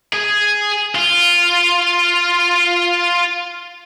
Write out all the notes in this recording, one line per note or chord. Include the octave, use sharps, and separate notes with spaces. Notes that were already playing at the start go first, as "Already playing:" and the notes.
G#4
F4